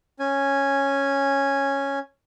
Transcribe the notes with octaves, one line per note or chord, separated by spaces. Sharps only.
C#4 G#5